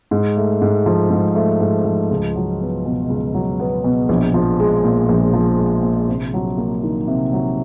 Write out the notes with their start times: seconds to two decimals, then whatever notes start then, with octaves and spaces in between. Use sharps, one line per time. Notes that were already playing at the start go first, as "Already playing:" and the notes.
0.11 G#2
0.37 A3
0.62 G#2
0.86 F3
1.10 G#2
1.35 A3
1.61 G#2
1.85 F3
2.11 C#2
2.36 F#3
2.61 B3
2.86 B2
3.10 C#2
3.35 F#3
3.60 B3
3.84 B2
4.09 A#1
4.34 F3
4.60 G#3
4.84 A#2
5.09 A#1
5.34 F3
5.58 G#3
5.83 A#2
6.08 C3
6.34 F#3
6.58 A#3
6.84 D#3
7.08 C3
7.33 F#3